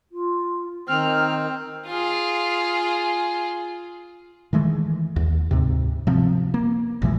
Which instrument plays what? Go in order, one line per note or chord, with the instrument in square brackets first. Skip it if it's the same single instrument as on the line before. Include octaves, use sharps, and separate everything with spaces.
[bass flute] F4
[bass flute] D#3 [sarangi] C4 [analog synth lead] F6
[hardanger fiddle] F4 G#4
[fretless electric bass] D#3 E3 G#3 A3
D#2
D2 G#2 C3
C3 F3 C4
A#3
A1 A#2 E3 G#3